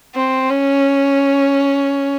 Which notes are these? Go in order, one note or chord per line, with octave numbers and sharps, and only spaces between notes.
C4
C#4